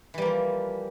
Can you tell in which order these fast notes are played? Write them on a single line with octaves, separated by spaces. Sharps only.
E3 G3 A#3 F3